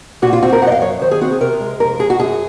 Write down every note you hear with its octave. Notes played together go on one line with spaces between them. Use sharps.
A#2 F#4
F4
C4 F#4
A#4
F#2 F#5
D#5
F5
F#3 C#5
D#3 C5
G#4
C4 F#4
G#4
C3 A#4
G#3
F2 A#4
G#3 G#4
F#4
F#2 G#4